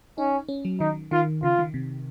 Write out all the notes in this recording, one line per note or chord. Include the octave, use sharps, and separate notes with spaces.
C#4 D#4
C#4
F#3
D#3 D#4
D#3 F4
C#3 F4
D#3
C3